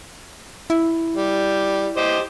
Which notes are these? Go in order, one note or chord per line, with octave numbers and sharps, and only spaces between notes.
E4
G3
G4 C5 D#5